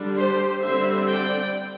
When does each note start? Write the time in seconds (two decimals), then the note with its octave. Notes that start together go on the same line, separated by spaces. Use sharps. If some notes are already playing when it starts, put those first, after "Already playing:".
Already playing: D3 G3 D4
0.15 G4 C5
0.62 D3 G3 C4 C5 E5
1.09 D5 G5